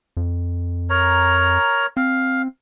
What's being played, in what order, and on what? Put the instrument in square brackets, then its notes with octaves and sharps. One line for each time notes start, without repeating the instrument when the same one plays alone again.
[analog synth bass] F2
[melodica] A#4 C#5 A#5
[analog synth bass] C4 [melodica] F5